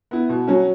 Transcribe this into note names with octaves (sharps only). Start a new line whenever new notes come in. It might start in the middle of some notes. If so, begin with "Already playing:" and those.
B3 E4
B2
F#3 C#4